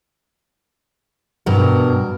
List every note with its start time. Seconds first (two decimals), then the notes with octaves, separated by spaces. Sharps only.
1.46 G2 B2 A#4